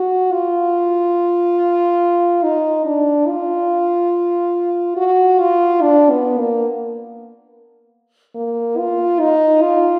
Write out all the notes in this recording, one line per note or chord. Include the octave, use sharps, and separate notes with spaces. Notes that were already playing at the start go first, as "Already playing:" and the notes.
Already playing: F#4
F4
D#4
D4
F4
F#4
F4
D4
B3
A#3
A#3
F4
D#4
F4